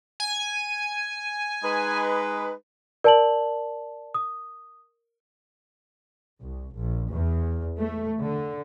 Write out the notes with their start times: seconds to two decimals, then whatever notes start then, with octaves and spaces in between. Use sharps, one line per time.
0.20 G#5
1.63 G#3 D#4 B4
3.04 A#4 D5 A5 F#7
4.14 D#6
6.41 C2
6.76 A#1
7.12 E2
7.80 A3
8.22 D3